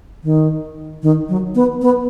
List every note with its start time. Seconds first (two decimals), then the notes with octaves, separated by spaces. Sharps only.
0.24 D#3
1.02 D#3
1.29 F#3
1.55 B3
1.81 B3